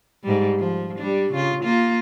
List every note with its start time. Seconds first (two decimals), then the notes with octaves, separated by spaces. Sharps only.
0.24 G#2 G3
0.59 F3
0.99 G3 D4
1.33 C#3 F4
1.64 A#3 F4